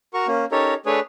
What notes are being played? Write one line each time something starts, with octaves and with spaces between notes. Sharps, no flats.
F#4 A#4 C#6
A#3 C#4
C#4 D#4 G4 A4 A#4 C#5
A3 D4 G#4 B4 C#5